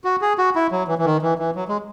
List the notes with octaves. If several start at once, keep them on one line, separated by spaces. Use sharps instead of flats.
F#4
G#4
F#4
E4
F#3
E3
E3
D#3
E3
E3
F#3
G#3